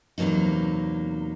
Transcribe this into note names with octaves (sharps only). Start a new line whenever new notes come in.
E2 C3 F#3 A#3 D#4